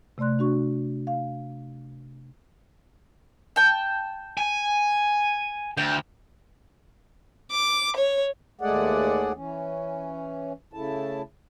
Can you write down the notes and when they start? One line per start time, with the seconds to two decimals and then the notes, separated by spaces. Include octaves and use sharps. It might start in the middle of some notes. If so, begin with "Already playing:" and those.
0.18 C3 A3 D5 C6 F#6
0.39 D4 F#4 C#6
1.07 F5
3.56 G5 A5
4.38 G#5
5.77 D2 G5
7.51 D6
7.96 C#5
8.61 D#2 G#3 A3 G#4 D5 F#5
9.36 E3 C#4
10.73 C#3 A3 E4 A5